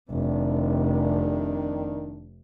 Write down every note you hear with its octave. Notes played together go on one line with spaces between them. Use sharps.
F1 C3 D#3 D4